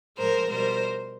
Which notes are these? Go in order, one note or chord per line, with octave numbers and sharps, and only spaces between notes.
A2 F3 G#3 A#4 C5
B2 G3 A#4 C5